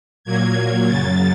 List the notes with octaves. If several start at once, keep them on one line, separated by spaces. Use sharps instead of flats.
A#2 F#3 A#3 G#6
F#2 C#3 F#3 A6